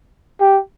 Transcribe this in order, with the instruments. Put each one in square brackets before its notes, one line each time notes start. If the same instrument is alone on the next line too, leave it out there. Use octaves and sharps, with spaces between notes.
[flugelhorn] G4